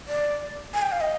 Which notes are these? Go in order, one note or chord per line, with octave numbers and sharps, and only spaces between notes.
D5
G#5
G5
F5
D#5